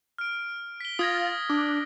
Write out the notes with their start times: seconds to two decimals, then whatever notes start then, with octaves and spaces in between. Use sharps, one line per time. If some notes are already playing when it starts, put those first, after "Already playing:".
0.18 F6 D7
0.80 B6 G7
0.99 F4 D#6 G#6 A#6
1.49 D4